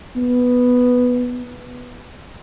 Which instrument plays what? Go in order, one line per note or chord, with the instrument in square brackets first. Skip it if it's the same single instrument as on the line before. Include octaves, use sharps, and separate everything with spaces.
[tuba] B3